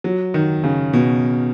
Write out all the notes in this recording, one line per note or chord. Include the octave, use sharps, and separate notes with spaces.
F#3
D#3
C#3
B2